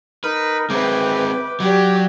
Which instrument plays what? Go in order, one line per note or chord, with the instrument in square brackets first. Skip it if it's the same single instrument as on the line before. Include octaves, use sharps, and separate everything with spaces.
[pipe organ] D#4 A#4 [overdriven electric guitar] B4
[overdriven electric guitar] G#3 C4 [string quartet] B4 E5 [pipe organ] G5 D6
[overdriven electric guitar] F#3 [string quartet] G4 D5